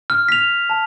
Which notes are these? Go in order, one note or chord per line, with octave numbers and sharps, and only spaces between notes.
F6
B6 F7
A5